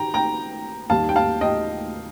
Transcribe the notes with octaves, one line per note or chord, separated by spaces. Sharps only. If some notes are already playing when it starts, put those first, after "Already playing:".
Already playing: D#3 G5 A#5
G5 A#5
D#2 D#3 G3 F5 A5
G5
F5 A5
D#5 G5